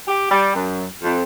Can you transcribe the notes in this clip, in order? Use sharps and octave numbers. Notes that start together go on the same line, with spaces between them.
G4
G3
F#2
F2